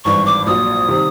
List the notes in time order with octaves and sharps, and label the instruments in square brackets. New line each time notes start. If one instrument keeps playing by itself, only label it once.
[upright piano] G#1 G2 E3 [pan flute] C#6
[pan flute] D6
[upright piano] A#1 A#2 F#3 [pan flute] D#6
[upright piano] C3 D#3 G3